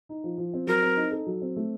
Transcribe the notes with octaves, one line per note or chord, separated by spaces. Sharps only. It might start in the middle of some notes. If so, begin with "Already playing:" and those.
D#4
F3
F3
C4
F#3 A#4
C4
D#4
A4
F#3
C4
A3